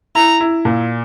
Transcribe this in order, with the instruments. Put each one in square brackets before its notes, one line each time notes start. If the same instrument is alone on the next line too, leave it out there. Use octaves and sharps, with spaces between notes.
[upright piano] E4 [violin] A#5
[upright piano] E4
A#2